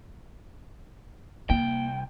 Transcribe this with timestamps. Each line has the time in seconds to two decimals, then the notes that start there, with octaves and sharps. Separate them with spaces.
1.50 C2 A#3 G5